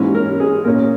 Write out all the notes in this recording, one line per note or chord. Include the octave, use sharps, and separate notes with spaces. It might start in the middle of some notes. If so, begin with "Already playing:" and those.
Already playing: G#2 E3 A#3 C#4 C#5
A#4
G#4
A#2 A#3 C#4 A#4